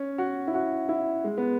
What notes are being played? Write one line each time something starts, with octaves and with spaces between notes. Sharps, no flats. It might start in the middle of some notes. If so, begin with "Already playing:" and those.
Already playing: C#4
F#4
E4
F#4
E4
G#3
B3